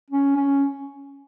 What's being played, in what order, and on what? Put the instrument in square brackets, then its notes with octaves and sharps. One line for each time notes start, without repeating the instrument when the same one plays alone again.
[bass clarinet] C#4
C#4